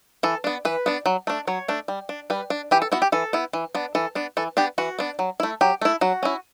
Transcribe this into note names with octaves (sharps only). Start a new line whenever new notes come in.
E3 A4
B3 D4
E3 B4
B3 D4
F#3
A3 D4
F#3 C#5
A3 D4
G3
D4
G3 B4
D4
E3 G4
A4
B3 E4 F#4
G4
E3 A4
B3 E4
E3
B3 D4
E3 A4
B3 D4
E3 A4
B3 D4 G4
E3 F#4
B3 D4
F#3
A3 E4
F#3 G4
A3 E4
F#3 F#4
C#4 E4